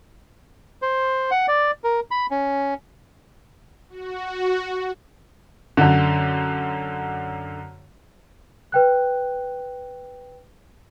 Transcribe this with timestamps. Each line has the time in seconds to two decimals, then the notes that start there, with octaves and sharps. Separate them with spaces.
0.82 C5
1.31 F#5
1.48 D5
1.84 A#4
2.11 B5
2.31 C#4
3.89 F#4
5.77 F#2 D3
8.72 B4 G5 F#6